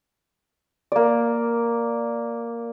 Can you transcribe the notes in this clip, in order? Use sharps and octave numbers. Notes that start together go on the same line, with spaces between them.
A#3 D5